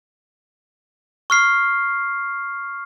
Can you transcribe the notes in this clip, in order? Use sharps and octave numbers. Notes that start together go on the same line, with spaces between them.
C#6 F6 C7